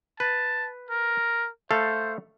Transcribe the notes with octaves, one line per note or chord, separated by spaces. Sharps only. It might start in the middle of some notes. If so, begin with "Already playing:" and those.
B4 A5
A#4
A3 A4 C5 F5